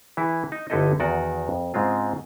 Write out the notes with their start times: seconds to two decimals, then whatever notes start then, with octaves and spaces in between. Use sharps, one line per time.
0.17 E3 E4 G#4
0.52 D#4
0.70 G1 D3 D#4 E4 A4 D#5
1.00 E2 D#3 F#4 D5 G5
1.49 F2
1.74 G#2 C#3 G#3 C4 F4